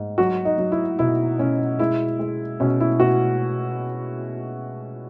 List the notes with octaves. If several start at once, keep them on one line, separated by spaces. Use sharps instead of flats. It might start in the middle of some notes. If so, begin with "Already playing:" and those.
Already playing: G#2
F#3 F#4
D#4
F#3
E4
B2 E4
B2 C#4
G#3 E4
G#3
B2 C#4
E4
B2 F#4